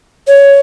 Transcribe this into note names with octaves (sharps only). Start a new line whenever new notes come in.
C#5